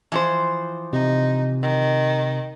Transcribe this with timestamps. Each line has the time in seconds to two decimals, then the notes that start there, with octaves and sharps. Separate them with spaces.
0.12 E3 F3 C5
0.93 C3 D#4
1.62 D#3